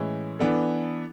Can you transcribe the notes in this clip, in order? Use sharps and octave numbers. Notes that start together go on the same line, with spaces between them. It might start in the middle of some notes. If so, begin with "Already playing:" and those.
Already playing: A2 E3 G#3 C#4 E4
E3 B3 D4 A4